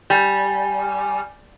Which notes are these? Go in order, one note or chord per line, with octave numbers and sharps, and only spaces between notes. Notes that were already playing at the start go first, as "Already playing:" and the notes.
G3 G#5